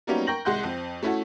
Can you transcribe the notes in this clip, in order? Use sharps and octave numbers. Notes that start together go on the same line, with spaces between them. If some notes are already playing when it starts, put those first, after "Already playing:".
F#3 G3 A#3 B3 C#4 D#4
A#4 G5 C#6 G6 A#6 F#7
C2 G#3 F#5 C6 G6
F2 C4
A3 C#4 E4 F#4 A4